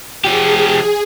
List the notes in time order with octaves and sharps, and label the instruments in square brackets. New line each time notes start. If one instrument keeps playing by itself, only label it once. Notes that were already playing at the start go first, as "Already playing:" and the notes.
[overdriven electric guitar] F3 G4 [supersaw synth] G#4